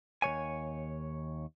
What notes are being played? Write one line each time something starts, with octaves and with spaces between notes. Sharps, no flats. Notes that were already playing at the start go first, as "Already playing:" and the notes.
D#2 F3 C#5 G#5